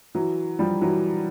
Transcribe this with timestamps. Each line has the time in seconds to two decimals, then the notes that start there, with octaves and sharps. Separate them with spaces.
0.15 E3 F#3
0.59 F3 G3
0.81 E3 F#3